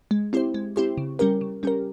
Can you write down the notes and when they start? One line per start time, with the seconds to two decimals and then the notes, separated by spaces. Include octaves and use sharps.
0.11 G#3
0.33 C4 E4 G4 C5
0.54 G#3
0.76 C4 E4 G4 C5
0.97 C#3
1.19 G3 C#4 G4 A#4
1.41 C#3
1.63 G3 C#4 G4 A#4